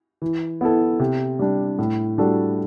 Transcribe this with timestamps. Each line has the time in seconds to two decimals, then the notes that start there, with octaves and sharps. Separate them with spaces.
0.22 E3
0.61 B3 E4 A4
0.99 C3
1.39 G3 D4
1.79 A2
2.18 G3 D4 F#4 A4